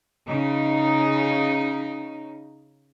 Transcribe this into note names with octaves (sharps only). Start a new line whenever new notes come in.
C#3 D#4